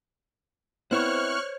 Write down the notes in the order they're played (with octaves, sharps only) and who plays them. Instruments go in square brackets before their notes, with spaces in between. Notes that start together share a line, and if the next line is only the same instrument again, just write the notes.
[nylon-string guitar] B3 C4 E4 [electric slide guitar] C5 C#5 [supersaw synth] C#6 F6 F#6